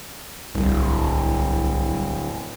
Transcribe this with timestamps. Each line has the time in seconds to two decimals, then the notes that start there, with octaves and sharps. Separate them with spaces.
0.55 D1 C2